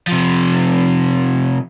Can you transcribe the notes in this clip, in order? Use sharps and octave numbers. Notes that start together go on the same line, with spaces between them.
C3 F3